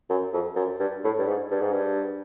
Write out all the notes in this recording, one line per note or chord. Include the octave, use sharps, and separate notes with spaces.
F#2
F2
F#2
G2
A2
G2
G#2
G2
G#2
G2